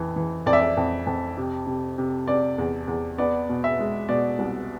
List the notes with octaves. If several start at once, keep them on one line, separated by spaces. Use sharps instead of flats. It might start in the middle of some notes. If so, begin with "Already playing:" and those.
Already playing: F2 E3
E3
F2 D5
E5
D5
F2
F2
C3
C3
C3
C3 D5
E2
E2
B3 D5
B2
E5
G#3
B2 D5
C2